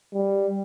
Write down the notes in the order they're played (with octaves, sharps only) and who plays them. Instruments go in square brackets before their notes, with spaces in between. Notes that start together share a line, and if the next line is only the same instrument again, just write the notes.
[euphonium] G3